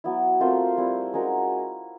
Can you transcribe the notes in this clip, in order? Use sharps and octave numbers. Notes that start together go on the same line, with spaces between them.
F#3 B3 E4
A3 C4 F4 A#4
G3 C4 E4
G#3 C#4 F#4 A#4